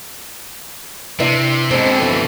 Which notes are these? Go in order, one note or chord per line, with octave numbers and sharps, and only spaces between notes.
C3 D4 E4 B4
G#2 B2 D3 G#3 C4
E3 F3 A3